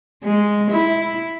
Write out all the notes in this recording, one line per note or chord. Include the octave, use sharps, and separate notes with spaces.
G#3
E4